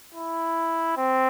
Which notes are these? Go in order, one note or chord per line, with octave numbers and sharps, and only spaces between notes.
E4
C4